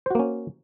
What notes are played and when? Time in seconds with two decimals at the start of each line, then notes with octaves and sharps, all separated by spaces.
0.06 C5
0.11 F#4
0.15 A#3
0.19 C#4